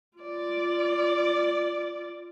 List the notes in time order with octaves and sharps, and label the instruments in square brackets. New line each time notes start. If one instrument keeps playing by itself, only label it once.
[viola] F4 D5